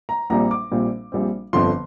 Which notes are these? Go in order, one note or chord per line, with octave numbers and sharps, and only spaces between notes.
A#5
A#1 A#2 G3 C4 A#5
D6
A#1 A#2 G3 C4
A#1 A#2 G3 C4
G1 F2 D3 F3 C6